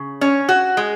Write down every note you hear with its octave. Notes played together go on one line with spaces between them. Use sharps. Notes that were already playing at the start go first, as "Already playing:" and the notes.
Already playing: C#3
C#4
F#4
G#3